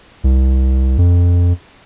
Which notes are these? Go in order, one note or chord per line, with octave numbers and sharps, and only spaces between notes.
C2
F2